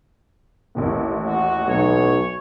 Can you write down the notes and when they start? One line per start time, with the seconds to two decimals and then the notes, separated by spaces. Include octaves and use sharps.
0.75 A1 D#2 A2
1.27 F#4
1.68 B1 C#5